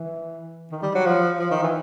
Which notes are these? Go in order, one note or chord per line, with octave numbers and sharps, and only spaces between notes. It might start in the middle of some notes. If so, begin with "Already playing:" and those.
Already playing: E3
D#3
G3
F#3
F3
F3
D#3
E3